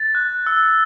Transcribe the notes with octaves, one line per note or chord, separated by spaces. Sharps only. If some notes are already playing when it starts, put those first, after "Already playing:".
Already playing: A6
F#6
E6